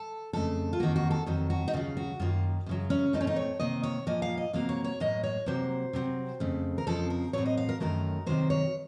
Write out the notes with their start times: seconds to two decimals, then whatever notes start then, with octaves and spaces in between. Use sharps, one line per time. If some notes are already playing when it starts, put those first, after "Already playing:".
Already playing: A4
0.33 F2 C#3 A3 A4
0.73 F4
0.80 F2 D#3 A#3 F#4
0.96 F#4
1.11 A4
1.26 F2 D#3 F#3 A4
1.50 F#4
1.68 D#4
1.73 D#2 C#3 F#3 F4
1.97 F#4
2.20 F#2 D#3 A#3 F4
2.66 F#2 C#3 F#3
2.90 C#4
3.13 A#2 A3 C4 D#4
3.21 C#4
3.27 D#4
3.36 C#5
3.60 C3 D#3 A#3 D#5
3.83 C#5
4.07 A#2 F3 A#3 D#5
4.22 F5
4.37 D#5
4.53 C3 F#3 A#3 F5
4.69 C#5
4.84 C#5
5.00 A2 F#3 A#3 D#5
5.23 C#5
5.46 C3 F#3 A#3 C5
5.93 C3 F#3 C4
6.40 F2 C#3 A3
6.78 A#4
6.87 F2 C#3 F3 C4 A4
7.10 A#4
7.33 A2 F#3 C4 C#5
7.46 D#5
7.57 F5
7.69 A#4
7.80 F#2 D#3 F#3 A3 A#4
8.27 C3 D#3 F#3 C5
8.50 C#5